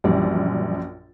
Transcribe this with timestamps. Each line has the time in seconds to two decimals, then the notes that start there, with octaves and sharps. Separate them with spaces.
0.04 A#1 F#2 E3 G3 D5